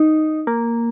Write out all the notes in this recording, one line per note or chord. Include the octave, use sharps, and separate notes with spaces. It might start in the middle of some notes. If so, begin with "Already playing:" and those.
Already playing: D#4
A#3